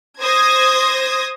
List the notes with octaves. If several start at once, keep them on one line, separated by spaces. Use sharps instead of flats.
C5 D#6 G#6 A#6